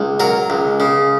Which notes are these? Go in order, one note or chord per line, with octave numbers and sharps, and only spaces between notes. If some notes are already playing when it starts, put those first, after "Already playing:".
Already playing: C#2
F#3 A#4
C#2
C#3